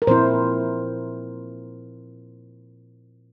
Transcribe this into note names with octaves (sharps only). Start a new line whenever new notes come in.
A#4
A#2 F3 C4 E4 C5